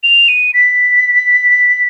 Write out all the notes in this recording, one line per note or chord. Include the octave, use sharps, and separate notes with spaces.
F7
D#7
B6